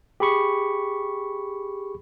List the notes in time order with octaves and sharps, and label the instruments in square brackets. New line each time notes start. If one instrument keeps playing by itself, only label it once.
[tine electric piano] G4 G#4 B5 C#6